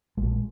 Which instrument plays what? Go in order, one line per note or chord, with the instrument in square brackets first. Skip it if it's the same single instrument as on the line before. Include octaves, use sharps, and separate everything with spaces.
[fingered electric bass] A#1 G#3